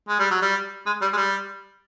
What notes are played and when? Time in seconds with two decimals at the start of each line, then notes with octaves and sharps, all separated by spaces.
0.08 G#3
0.19 G3
0.30 F#3
0.42 G3
0.86 G#3
1.01 G3
1.13 G#3
1.17 G3